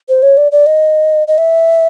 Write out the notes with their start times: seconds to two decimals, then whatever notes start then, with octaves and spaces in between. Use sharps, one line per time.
0.09 C5
0.22 C#5
0.37 D5
0.52 D5
0.66 D#5
1.28 D#5
1.38 E5